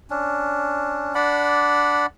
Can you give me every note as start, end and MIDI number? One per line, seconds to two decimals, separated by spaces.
0.10 1.15 61
0.10 1.15 62
1.15 2.06 62
1.15 2.06 74
1.15 2.06 78
1.15 2.06 83